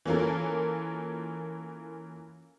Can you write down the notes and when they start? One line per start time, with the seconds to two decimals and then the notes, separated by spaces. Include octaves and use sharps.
0.06 E3 A#3 C#4 F4 A4 A#4